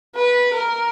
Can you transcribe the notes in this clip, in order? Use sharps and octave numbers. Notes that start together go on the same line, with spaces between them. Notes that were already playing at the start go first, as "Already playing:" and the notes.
B4
A#4